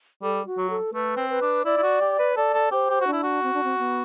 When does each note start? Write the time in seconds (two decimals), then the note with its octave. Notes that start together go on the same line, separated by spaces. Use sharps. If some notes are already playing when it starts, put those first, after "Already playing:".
0.22 G3 A4
0.46 F#4
0.57 F#3
0.70 A4
0.93 A3 B4
1.17 C4
1.30 B4
1.42 D4
1.65 E4 D5
1.77 E4
1.83 F#4
2.01 G4
2.19 B4
2.37 A4 D5
2.54 A4
2.71 G4 C5
2.90 G4
3.01 F#4
3.07 D4
3.12 E4
3.23 F#4
3.43 C4
3.54 D4
3.64 C4
3.79 B3